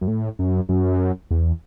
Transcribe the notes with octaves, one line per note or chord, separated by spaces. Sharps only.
F#2
A2
F#2
F#2
E2